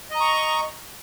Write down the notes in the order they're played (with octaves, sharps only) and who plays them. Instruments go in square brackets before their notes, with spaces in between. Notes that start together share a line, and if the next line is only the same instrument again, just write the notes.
[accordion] D#5
A#5
C#6